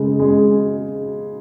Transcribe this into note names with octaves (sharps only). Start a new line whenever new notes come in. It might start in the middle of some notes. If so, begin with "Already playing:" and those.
Already playing: C#3 G#3
G#3